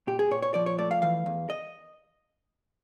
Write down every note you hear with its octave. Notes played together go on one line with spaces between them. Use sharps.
A#2 G4
G#4
A#2 C#5
C#5
F3 D5
C#5
A3 D5
F5
E3 F5
E2
D#5